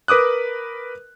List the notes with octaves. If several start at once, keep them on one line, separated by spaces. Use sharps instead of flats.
A#4 B4 D6 D#6 F#6